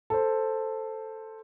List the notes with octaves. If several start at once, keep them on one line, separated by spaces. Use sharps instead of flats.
A4 C5